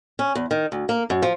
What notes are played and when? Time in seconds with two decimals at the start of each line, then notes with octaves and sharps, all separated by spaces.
0.19 C#4
0.35 E2
0.51 D#3
0.72 D2
0.89 A#3
1.10 F#2
1.22 F3